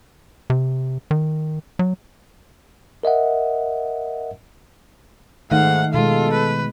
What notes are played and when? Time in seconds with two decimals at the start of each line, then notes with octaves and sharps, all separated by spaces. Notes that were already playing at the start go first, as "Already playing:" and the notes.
0.50 C3
1.11 D#3
1.79 F#3
3.03 A#4 D#5 E5 F#5
5.52 G#2 D#3 A3 D#4 F5 F#5
5.94 B2 G#3 F4 A4
6.33 B4